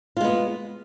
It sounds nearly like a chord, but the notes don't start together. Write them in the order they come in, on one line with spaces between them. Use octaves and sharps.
F4 G#3 B3